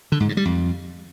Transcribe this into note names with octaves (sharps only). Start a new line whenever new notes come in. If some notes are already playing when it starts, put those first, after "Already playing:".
D3
G#2
G2
G3
F2